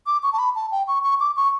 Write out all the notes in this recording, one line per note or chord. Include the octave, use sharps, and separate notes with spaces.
D6
C#6
A5
B5
A5
G5
C#6
C#6
D6
C#6